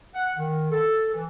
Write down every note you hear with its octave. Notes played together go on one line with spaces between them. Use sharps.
F#5
D#3
A4
E3